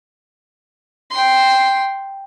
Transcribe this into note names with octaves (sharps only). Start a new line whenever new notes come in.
G5 C6